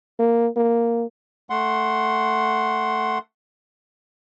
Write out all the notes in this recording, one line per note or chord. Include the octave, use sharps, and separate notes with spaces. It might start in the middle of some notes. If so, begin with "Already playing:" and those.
A#3
A#3
A3 F#5 C6